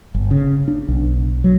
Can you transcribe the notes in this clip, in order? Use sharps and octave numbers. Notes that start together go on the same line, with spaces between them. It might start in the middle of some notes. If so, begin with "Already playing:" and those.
G1
C#3
D4
B1
F#3